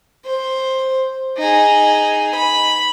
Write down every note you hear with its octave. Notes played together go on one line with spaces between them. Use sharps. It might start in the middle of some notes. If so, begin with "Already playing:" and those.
C5
D#4 G#4
B5